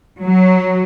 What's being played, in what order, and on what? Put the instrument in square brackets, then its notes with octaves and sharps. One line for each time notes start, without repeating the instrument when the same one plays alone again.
[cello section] F#3